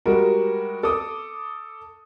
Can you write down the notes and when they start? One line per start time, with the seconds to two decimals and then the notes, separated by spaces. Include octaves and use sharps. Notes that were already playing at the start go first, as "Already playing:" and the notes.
0.06 G3 G#3 F#4 A#4
0.83 A4 D6 D#6